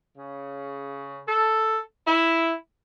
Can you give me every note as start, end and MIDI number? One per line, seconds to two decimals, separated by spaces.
0.17 1.20 49
1.27 1.78 69
2.07 2.53 64